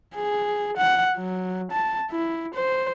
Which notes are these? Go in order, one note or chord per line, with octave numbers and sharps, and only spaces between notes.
G#4
F#5
F#3
A5
E4
C5